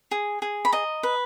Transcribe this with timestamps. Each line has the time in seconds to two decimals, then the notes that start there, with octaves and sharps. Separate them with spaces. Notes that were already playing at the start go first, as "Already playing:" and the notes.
0.11 G#4
0.42 G#4
0.65 B5
0.72 D#5 A#5
1.03 B4